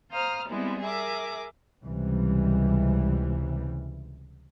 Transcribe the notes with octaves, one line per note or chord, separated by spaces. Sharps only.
C5 F5 A#5 D#6 F6
G3 G#3 B3 C4 E4
G#4 A#4 E5 D6
C#2 C3 E3 G3